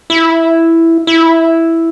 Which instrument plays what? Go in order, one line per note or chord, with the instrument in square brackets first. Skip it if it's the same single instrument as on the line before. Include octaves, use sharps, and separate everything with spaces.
[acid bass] E4
E4